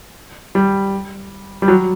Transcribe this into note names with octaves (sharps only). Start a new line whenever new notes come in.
G3
G3
F#3